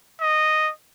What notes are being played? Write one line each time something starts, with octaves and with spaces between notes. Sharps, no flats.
D#5